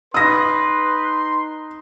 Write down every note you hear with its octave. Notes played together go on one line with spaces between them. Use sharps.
D#4 B4 C6 D#6 A#6